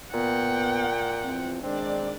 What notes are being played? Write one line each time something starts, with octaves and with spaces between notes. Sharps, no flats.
A#2 B3 F#5 G5
E2 F3 C4
D#3 G#3 C4 D4 D5